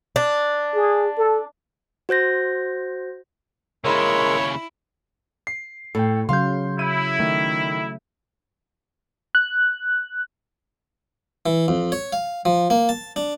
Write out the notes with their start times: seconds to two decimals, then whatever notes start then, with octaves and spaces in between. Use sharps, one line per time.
0.16 D4
0.75 G#4
1.18 A4
2.09 F#4 C5 G6 A#6
3.84 D#2 C#3 G#3 E4 A#4 C#5 E6
5.47 C7
5.95 A2 A4 G5
6.29 C#3 F#3 F5 C6 G6
6.79 E4 D#7
7.19 D#3 A3
9.35 F#6
11.46 E3
11.68 F2
11.92 C#5
12.13 F5
12.45 F3
12.70 A#3
12.89 A5
13.16 D4